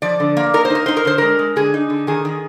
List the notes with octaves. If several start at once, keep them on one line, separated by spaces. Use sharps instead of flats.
F3 D5
D3
A#3
D#4 A#4
C5
D#4 A#4
D#4 C5
A#4
D3 C5
G#3 A#4
G#3
D3 G#4
D#4
D3
D#3 G#4
D#3